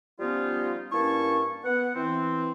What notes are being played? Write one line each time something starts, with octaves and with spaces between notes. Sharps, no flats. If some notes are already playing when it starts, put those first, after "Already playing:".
F3 G3 B3 C#4 D#4 F4
G2 A#3 C#4 E4 A5 C#6
B3 F#5
E3 C4